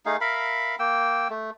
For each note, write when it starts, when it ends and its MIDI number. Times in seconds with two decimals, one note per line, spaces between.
0.06 0.17 57
0.06 0.17 63
0.06 0.17 68
0.06 0.17 77
0.21 0.76 70
0.21 0.76 76
0.21 0.76 77
0.21 0.76 83
0.79 1.28 58
0.79 1.28 79
0.79 1.28 88
1.30 1.50 57